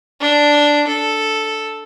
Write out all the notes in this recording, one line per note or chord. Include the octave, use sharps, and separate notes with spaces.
D4
A4